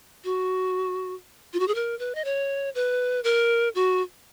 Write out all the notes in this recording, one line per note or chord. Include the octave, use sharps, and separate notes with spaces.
F#4
F4
F#4
G#4
A#4
B4
D#5
C#5
B4
A#4
F#4